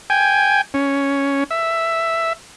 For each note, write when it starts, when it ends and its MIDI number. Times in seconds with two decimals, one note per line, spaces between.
0.10 0.61 79
0.10 0.61 80
0.74 1.44 61
1.51 2.33 76